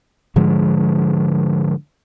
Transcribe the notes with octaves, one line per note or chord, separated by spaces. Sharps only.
G#2 D3 F3 G#3